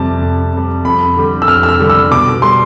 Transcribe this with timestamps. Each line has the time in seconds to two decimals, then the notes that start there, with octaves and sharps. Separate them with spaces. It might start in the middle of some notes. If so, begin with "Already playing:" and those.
Already playing: F2 C3 G3 A5
0.21 F2
0.53 C3 G3
0.85 F2 B5
1.16 D3 G3
1.42 E6
1.48 F2 F6
1.63 E6
1.69 F6
1.79 D3 G3
1.89 E6
2.11 B2 D6
2.42 G3 C6